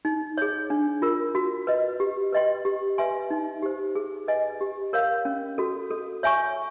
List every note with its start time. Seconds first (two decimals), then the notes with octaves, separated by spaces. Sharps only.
0.05 D#4
0.38 G#4 C#5
0.70 D4
1.02 F4 A#4
1.35 F#4
1.67 B4 D#5
2.00 G4
2.33 B4 D#5 G5 C6
2.65 G4
2.98 B4 E5 G#5 C6
3.31 D#4
3.62 G4 C5
3.95 G#4
4.28 B4 D#5 G#5
4.61 G4
4.93 A#4 C#5 F5
5.25 C#4
5.58 F#4 A4
5.91 A4
6.23 C#5 E5 G#5 C#6